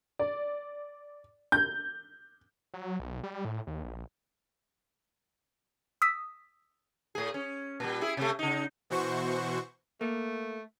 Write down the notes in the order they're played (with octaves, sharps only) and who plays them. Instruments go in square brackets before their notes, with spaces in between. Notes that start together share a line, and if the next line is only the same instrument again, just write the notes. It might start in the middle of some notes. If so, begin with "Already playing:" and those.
[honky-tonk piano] D5
G6
[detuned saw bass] F#3
B1
G3
A2
D#2
A#1
[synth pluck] D#6 E6 B6
[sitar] A2 G#4
C#4
A#2 G3
E4 G#4
C3 A3
C#3 D#4
[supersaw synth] B2 E3 F#4 C5 C#6
[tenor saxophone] A3 [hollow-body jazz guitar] A#3